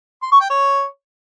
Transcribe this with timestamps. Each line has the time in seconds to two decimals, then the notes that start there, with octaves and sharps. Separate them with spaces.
0.22 C6
0.31 C#6
0.41 G5
0.50 C#5